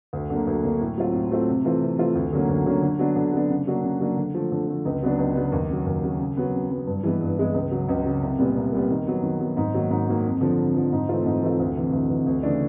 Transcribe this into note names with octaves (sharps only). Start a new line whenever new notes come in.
D2
D3 F#3 A#3
D2
D3 F#3 A#3
A2
F#3 A3 C4 F4
A2
F#3 A3 C4 F4
C3
E3 A3 C4 F4
C3
E3 A3 C4 F4
D2
D3 F#3 A#3 C#4
D2
D3 F#3 A#3 C#4
D3
F#3 B3 D4
D3
F#3 B3 D4
C#3
F#3 A#3 D4 F#4
C#3
F#3 A#3 D4 F#4
D3
F3 A3
D3
F3 A3
C#2
C#3 F#3 B3 D4
C#2
C#3 F#3 B3 D4
D#2
C#3 F#3
D#2
C#3 F#3
C#3
F#3 B3
C#3
F#3 B3
G2
E3 G#3 B3
G2
E3 G#3 B3
C#2
C#3 F#3
C#2
C#3 F#3
C2
A#2 G3 B3
C2
A#2 G3 B3
D#3
F#3 B3
D#3
F#3 B3
G#2
D#3 F#3 A#3
G#2
D#3 F#3 A#3
F2
D3 F3
F2
D3 F3
G#2
E3 A3 C4 F4
G#2
E3 A3 C4 F4
D2
C3 E3
D2
C3 E3
D2
C#3 E3 A3 D4